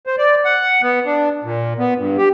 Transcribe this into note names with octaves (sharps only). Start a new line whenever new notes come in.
C5
D5
F#5
B3
D4
A#2
B3
G2
G4